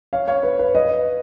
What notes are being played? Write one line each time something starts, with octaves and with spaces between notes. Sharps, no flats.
C#5 F5
C#5 F5
B4
B4
B4 D#5